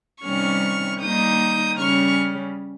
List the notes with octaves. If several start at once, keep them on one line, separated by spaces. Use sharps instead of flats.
C3 D#3 G3 C#4 C#6 F6
D#3 G3 A#3 D#4 D#6 G6
C#3 G3 C#4 C#6 F6